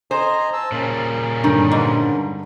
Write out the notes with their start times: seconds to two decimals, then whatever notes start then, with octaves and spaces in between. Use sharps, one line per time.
0.11 C5 D#5 G#5 A#5
0.53 A5 E6
0.72 A#2 C#3 G3 C#4 A#4
1.44 G2 D3 D#3
1.72 G#2